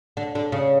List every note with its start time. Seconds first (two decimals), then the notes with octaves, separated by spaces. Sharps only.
0.17 D3
0.35 D3
0.52 C#3